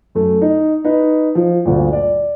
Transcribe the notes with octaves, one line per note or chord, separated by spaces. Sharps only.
F#2 A3
D#4
D#4 B4
F3
D2 G2 A#2
D5